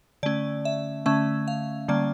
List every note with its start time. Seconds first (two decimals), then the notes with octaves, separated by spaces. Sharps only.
0.23 D3 A3 C#4 D5
0.65 E5
1.06 D3 A3 C#4 E5
1.48 F5
1.88 D3 G3 A#3 C#4 D5